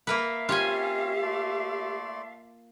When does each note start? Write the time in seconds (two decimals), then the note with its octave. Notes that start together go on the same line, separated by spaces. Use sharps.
0.07 A#3 A#4 B4 E5 F5
0.49 C4 C#4 F4 G4 C#5 G#5
1.22 A3 D5 C6